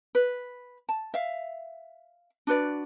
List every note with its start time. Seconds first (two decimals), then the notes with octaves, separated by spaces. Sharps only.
0.15 B4
0.89 A5
1.14 E5 F5
2.47 D4 F#4 B4 D5